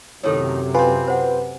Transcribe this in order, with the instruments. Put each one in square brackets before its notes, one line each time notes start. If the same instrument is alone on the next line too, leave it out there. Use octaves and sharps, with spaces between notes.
[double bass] F#2 C3 [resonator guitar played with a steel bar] A2 D#3 D#4 [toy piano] A4 C#5
[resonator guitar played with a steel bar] C4 F4 [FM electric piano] B4 [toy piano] G#5
[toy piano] C5 F#5